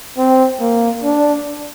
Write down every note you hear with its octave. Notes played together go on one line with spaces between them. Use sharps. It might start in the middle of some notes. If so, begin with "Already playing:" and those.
C4
A#3
D4